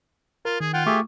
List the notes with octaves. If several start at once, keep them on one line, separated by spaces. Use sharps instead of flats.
F4 A#4
D#3 G#4
F4 F#5 G5
A3 G4 G#4 E5 C#6 D6